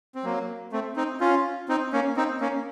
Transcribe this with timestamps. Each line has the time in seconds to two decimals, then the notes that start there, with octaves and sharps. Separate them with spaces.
0.15 C4
0.24 F#3 A#3
0.72 A3 C4
0.96 C4 D#4
1.21 C#4 F4
1.69 C4 D#4
1.93 A#3 C#4
2.17 C4 D#4
2.41 A#3 C#4